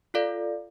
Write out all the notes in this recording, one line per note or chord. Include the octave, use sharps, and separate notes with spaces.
F4 A4 D5 F5